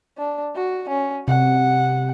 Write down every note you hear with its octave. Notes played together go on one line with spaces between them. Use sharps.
D4
F#4
C#4
C3 F#5